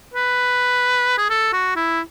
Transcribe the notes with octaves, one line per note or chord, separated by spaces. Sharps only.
B4
G#4
A4
F#4
E4